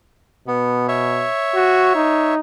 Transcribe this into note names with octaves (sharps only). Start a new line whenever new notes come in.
B2 B3
C#5 E5
F#4
D#4